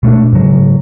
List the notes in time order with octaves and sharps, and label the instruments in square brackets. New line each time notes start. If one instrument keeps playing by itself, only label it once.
[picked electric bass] B2 A3 A#3 D4
G#2 C#3 F#3